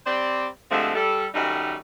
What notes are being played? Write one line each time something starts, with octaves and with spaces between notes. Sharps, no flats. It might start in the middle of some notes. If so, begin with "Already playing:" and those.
G3 C4 C5 D5
G2 D3 F3 G#3 A3 C4
G3 A4
F#2 D#3 G3 A3 D#4